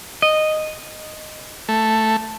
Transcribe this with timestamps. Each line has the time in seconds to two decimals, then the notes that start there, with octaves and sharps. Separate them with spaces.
0.22 D#5
1.69 A3